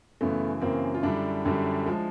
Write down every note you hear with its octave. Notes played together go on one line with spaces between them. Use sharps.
F#2 C#3 E3 A3 B3
F#2 C#3 E3 A#3 C4
F4
F#2 D3 G3 D4 E4
F#2 D3 G3
F3 G#3